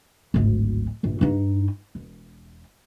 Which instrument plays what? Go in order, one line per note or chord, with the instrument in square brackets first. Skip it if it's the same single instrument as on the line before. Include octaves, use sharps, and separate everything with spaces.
[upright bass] D1 G#1
A#1 G2
G2 D#4
E1